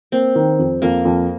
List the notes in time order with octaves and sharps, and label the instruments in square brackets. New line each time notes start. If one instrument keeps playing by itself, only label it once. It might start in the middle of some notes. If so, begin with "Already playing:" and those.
[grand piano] A#3 [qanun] C4
[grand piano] D#3
F2
[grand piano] F2 [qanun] A#3
[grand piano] F2